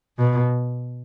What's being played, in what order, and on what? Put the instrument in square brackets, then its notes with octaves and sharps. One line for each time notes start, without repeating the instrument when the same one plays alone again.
[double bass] B2